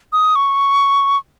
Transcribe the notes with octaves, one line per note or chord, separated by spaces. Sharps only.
D#6
C#6